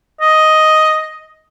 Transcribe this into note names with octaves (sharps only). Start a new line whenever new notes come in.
D#5